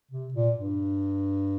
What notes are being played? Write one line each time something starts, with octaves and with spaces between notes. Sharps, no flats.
C3
A#2
G2